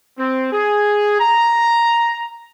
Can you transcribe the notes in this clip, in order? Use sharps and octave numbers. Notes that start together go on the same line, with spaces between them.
C4
G#4
A#5